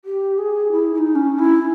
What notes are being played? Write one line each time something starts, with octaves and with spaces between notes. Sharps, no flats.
G4
G#4
E4
E4
D#4
C#4
E4